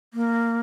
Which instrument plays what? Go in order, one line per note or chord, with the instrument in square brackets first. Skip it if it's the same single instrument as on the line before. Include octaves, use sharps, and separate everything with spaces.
[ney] A#3